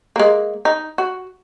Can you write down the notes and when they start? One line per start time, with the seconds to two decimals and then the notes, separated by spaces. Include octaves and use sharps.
0.16 G#3 A#3
0.65 D#4
0.98 F#4